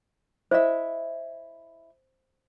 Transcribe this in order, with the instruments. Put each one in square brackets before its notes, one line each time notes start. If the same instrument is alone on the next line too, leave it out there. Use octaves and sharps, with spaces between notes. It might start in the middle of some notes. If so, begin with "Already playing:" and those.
[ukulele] E4 D#5 E5 [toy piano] C5